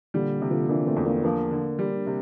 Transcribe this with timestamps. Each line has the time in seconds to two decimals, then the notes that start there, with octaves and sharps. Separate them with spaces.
0.14 A#2 D3 G3
0.42 C3
0.50 D3 F3
0.69 E3 A#3 D4
0.87 A3 C4
0.96 E2
1.06 A#3 D4
1.24 F3 A#3 D4
1.51 D3
1.79 G3
2.07 C3